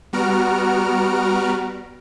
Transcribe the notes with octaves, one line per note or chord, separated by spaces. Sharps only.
G3 B3 F#4 A#5 F6 D7